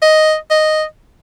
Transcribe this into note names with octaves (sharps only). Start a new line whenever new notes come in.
D#5
D#5